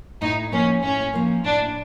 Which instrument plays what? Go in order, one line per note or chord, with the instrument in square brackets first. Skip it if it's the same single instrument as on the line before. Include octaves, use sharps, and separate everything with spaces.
[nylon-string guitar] A2 [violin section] D#4
[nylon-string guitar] F3 A#3 [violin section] C#4
[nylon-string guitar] A2 [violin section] C#4
[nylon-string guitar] F3 A#3
[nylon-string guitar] A2 [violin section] D4